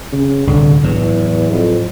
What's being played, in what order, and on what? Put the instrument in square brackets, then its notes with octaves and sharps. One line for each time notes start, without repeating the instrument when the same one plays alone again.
[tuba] C#3
[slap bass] D1 C2 [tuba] D3
[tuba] E2 [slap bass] A2 F#3
[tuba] F2